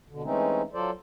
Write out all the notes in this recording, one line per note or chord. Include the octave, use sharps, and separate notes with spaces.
B2 D3
E3 G#3 A3 C4 C#4 D#4
F#3 F4 A4 C5 D5